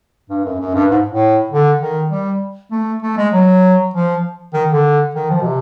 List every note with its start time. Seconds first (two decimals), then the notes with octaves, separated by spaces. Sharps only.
0.30 G2
0.45 F#2
0.60 F#2
0.75 G2
0.91 G#2
1.10 A2
1.51 D3
1.81 D#3
2.11 G3
2.71 A3
3.02 A3
3.17 G#3
3.33 F#3
3.94 F3
4.53 D#3
4.69 D3
5.15 D#3
5.30 F3
5.41 B2
5.45 C3